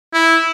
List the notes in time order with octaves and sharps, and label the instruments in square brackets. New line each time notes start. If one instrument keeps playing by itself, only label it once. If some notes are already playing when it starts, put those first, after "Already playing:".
[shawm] E4